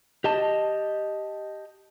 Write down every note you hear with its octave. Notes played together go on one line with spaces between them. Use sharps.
G4 D#5 A5